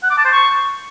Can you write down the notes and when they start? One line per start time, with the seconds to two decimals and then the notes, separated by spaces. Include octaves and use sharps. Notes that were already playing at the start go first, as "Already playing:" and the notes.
0.03 F#5
0.11 D6
0.18 A5
0.25 C5
0.32 C#6